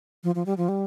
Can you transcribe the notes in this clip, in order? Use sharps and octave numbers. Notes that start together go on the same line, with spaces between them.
F3
F3
G3
F3
G3